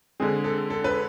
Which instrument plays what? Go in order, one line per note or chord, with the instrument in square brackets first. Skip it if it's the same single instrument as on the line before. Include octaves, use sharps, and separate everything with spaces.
[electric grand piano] D3 G#3 C4 [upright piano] G#4
[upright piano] A4
A4
B4